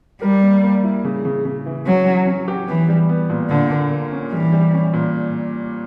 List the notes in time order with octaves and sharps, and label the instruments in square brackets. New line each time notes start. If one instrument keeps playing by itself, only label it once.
[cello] G3 [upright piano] A#4
[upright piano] A#3
A#3
E4
C#3
C#3
C#3
E3
[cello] F#3 [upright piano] C#4
[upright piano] C#4
C#4
G4
[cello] E3 [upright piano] B3
[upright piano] G3
B3
A#2
[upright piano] A#2 [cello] D3
[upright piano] A#3
A#3
C#4
[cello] E3 [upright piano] G3
[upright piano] G3
C#4
A#2